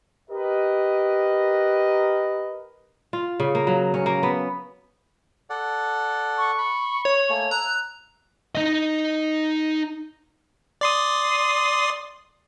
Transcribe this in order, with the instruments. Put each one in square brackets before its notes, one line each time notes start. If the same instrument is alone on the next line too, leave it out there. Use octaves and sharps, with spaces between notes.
[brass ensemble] G4 A#4 B4 D#5
[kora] F4
C#3
A#3
F#3
C#4
A#3
B3
[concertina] A4 D5 F#5
[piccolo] C#6
[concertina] B5
[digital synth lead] C#5
[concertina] A3 A#3 G#5
[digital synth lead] A#5 [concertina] E6 [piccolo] F#6
[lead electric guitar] D#4 D#5
[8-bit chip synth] D5 C6 D#6